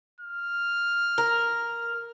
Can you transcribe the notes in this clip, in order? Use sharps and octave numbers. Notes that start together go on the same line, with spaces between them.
F6
A#4